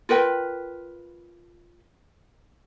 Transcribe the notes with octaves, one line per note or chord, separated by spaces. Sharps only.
F4 A#4 B4 G5